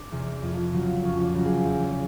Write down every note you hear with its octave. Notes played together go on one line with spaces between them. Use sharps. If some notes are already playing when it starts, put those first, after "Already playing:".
Already playing: D4
E2 C3
F2
C#3 F#3
F2 C#4
D4
C#3 F#3
G#4
E2